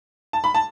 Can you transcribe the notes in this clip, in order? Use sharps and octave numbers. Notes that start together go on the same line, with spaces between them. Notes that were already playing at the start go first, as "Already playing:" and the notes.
A5
B5
A5